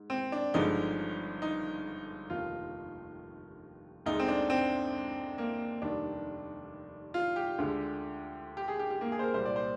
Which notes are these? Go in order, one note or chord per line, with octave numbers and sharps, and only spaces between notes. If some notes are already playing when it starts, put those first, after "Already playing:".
Already playing: G#2
C4
D4
G1 G2 D3 F3 G#3 D#4
D#4
F1 D#2 D#3 F4
D2 D3 G#3 D#4
C4
D4
C4
A#3
F1 D#2 D#3 G3 D4
F4
G4
D2 D3 G#3
G4
G#4
G4
G4
A#3
G#4
C5
A#4
C2 A#2 G3 C5
D5
C5